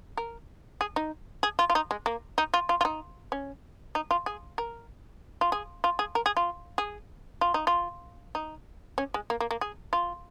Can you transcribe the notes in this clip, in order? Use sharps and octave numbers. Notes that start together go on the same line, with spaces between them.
A#4
G#4
D#4
G#4
F4
F4
D#4
G#3
A#3
D#4
F4
F4
F4
D#4
C#4
D#4
F4
G#4
A#4
F4
G#4
F4
G#4
A#4
G#4
F4
G#4
F4
D#4
F4
D#4
C#4
G#3
A#3
A#3
A#3
G#4
F4